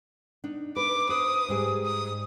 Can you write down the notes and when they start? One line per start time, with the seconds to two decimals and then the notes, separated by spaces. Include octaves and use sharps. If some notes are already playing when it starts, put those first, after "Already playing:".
0.44 D4 D#4
0.76 B4 D6
1.09 B4 C5 D#6
1.48 G#2 G3 G#4
1.86 D#6